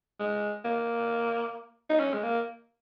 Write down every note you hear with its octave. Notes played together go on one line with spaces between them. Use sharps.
G#3
A#3
D#4
C#4
G#3
A#3